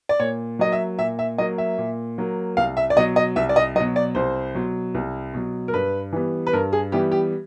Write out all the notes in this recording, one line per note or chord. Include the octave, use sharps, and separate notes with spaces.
D5
A#2 C#5
F#3 A#3 D#5
E5
A#2 E5
E5
F#3 A#3 D#5
E5
A#2
F#3 A#3
C2 F5
E5
D5
B2 F#3 D#5
D#5
C2 E5
D5
D#5
B2 F#3 D#5
D5
C2 C5
B2 F#3
C2
B2 F#3
A#4
G2 B4
E3 G3 B3
B4
G2 A#4
G#4
E3 G3 B3 G4
G4